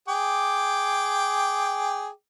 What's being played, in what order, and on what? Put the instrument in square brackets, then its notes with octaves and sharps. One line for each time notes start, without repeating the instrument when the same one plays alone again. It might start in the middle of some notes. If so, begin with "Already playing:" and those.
[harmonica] G#4 G5 D6